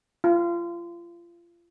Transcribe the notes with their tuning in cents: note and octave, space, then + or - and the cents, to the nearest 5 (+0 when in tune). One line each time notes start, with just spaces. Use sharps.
F4 -30